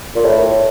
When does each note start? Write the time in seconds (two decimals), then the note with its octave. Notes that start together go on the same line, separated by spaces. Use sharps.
0.16 A#2
0.25 A2